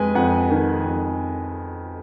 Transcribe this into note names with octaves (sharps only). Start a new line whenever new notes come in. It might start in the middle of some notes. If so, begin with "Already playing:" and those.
Already playing: F2 G#3 B4 G#5
F2 F#5
D#3
F2